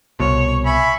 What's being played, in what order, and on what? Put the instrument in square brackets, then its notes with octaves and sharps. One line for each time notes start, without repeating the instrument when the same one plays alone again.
[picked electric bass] C2 B2 [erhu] C#5
[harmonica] E5 G#5 B5 [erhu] C#6